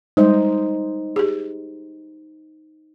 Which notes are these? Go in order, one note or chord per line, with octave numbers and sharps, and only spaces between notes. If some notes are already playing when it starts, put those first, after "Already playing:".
G3 G#3 D#4 C5 D#5
G4 G#4